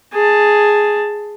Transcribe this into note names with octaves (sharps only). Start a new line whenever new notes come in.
G#4 A5